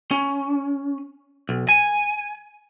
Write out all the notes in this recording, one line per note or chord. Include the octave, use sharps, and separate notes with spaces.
C#4
B1
G#5